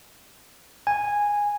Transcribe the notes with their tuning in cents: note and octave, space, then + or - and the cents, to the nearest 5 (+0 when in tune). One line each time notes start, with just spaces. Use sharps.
G#5 -10